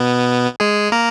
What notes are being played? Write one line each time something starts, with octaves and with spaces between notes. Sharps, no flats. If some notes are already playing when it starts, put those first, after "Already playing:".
Already playing: B2 B3
G#3 G#4
A#3 A#4